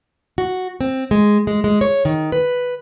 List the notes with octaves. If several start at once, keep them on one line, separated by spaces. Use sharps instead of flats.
F#4
C4
G#3
G#3
G#3
C#5
D#3
B4